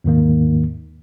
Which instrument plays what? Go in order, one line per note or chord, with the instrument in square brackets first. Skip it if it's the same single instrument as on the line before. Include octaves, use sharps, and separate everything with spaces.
[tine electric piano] D#2 G#2 D#3 A#3